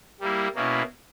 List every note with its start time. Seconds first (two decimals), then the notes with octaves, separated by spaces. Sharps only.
0.20 G3 A#3 E4
0.55 B2 A#3 C#4 E4